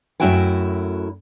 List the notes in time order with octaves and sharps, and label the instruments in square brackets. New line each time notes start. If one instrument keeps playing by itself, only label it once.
[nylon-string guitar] F#2 A3 E4 F#4 G5 G#5